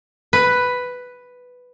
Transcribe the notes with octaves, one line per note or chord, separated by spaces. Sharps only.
B4